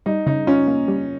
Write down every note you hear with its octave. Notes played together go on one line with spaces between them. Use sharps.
G3 D#4
C#3 D#4
C#4 F4
A#3
G3